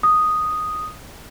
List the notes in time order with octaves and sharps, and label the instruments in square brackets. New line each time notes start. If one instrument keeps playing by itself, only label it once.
[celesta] D#6